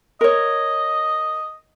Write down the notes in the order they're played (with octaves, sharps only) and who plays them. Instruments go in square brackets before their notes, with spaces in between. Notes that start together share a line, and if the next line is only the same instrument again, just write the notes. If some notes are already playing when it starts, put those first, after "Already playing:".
[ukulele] A#4 C#5 [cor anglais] D#5